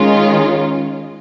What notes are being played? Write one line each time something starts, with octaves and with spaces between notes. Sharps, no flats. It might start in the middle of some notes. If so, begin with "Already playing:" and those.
Already playing: D#3 G#3 C#4 F4